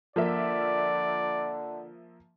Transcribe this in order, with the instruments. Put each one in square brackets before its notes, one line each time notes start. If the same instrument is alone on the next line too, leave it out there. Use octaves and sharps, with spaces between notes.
[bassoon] D3 [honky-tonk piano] F3 A#3 E5 [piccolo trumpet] D5